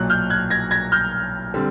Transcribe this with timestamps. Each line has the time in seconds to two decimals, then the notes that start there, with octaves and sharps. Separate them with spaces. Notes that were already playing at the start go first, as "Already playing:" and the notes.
Already playing: B1 A#2 F#3 F#6
0.10 F6 G6
0.30 F#6 G#6
0.50 G#6 A#6
0.71 G#6 A#6
0.92 F6 G6
1.54 D3 G3 C4